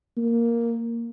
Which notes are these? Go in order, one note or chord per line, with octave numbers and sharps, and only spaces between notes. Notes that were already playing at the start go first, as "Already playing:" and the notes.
A#3